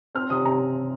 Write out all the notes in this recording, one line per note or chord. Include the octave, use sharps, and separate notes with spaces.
C4 F6
C3 D#6
C3 A#5